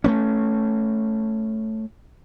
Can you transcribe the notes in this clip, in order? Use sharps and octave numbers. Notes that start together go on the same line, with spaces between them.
A3 B3 C#4